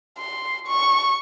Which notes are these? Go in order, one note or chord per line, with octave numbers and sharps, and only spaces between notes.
C6
C#6